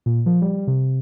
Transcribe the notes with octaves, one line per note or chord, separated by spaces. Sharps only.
A#2
F3
G3
C3